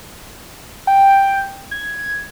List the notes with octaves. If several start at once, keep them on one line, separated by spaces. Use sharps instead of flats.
G5
G#6